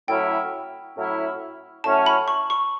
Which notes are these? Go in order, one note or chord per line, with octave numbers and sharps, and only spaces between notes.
A2 F#3 C#4 E4 G5
A2 F#3 C#4 E4
A2 F#3 C#4 E4 A5
B5
C#6
C#6